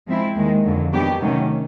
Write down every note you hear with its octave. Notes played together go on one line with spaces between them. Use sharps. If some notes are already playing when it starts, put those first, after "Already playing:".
F3 G#3 C4 E4
D#2 D#3 G#3
F2 D3 F#3
D#3 F#3 B3 D4 G4
C3 D#3 F#3 A3 C#4